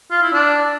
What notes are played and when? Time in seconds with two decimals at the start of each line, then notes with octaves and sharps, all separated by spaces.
0.11 F4
0.22 E4
0.33 D4